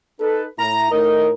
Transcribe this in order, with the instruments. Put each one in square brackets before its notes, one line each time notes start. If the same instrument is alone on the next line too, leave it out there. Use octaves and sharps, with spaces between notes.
[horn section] D#4 B4 [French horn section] A4
[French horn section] A2 E4 [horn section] A#5
[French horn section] A2 A#4 [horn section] D#4 D#5